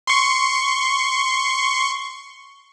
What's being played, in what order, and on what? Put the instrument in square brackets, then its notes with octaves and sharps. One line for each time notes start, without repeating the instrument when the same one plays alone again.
[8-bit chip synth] C6 C#6